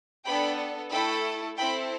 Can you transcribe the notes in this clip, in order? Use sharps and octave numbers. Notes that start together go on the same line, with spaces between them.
B3 D4 A4 G5 B5
A3 E4 A4 G5 B5
C4 E4 A4 G5 B5